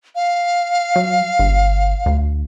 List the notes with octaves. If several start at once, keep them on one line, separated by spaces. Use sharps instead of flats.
F5
F#3
G1
D2